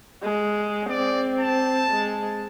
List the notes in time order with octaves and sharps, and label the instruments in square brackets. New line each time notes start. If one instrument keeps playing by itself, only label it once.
[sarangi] G#3
[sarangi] C4 [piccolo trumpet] D5
[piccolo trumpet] A5
[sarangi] G#3